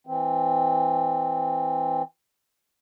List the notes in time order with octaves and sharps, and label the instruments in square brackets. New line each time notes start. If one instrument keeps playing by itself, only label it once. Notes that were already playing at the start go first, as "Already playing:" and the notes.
[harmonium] E3 C4